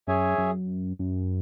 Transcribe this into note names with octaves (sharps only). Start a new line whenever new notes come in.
F#2 G#4 C#5 E5 G#5
F#2
F#2